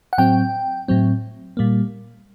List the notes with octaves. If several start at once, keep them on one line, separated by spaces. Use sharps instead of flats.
F#5
A2 F#3 C4 G5
A2 F#3 C4
A#2 G3 A#3